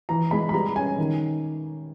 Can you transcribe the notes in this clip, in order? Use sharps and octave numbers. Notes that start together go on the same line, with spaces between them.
E3 A#5
G#3 B5
B5
G3 A#5
C#4 G#5
D#3